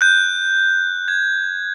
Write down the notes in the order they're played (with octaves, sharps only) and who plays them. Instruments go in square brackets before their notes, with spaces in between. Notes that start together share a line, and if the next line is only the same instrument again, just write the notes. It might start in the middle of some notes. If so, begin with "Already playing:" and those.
[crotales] F#6 G6
G#6